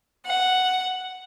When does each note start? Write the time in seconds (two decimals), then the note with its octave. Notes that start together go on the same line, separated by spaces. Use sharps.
0.26 F#5